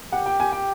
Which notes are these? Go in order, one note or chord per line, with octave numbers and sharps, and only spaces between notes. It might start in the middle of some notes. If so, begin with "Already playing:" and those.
G4 F#5
G5
G#5
G5